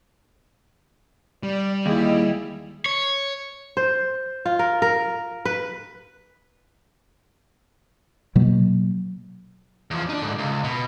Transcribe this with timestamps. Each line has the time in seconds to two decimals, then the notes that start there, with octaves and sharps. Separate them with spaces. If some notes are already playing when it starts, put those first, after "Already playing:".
1.43 G3 D5
1.86 D#2 E4 G#4 D#5
2.86 C#5
3.77 C5
4.46 F4
4.59 A#4
4.82 A#4
5.45 B4
8.35 B2 F#3 A#3
9.91 E2 F3
10.09 D4 D#4
10.22 D2 G#2
10.38 C#2
10.64 B2